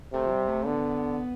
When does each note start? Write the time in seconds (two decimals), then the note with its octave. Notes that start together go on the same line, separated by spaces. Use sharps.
0.13 C3 A3
0.26 F3
0.31 G3
0.48 A3
0.66 D3 B3